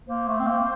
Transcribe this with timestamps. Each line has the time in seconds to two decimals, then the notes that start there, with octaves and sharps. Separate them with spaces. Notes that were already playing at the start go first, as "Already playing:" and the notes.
0.07 A#3 C5
0.28 A3
0.40 C4
0.47 A#3